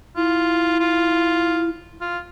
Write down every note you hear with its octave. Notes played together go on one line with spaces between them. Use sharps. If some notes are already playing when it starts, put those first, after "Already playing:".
E4 F4
F4
F4